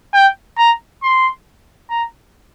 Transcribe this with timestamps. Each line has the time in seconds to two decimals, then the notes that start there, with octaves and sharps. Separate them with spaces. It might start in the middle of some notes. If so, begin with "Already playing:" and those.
0.14 G5
0.58 A#5
1.03 C6
1.90 A#5